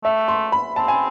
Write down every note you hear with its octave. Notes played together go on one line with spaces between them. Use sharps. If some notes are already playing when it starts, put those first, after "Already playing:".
A3 E5
C6
B5
C4 A5
G#5